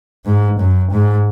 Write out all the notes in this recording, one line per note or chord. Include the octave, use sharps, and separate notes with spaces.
G#2
F#2
G#2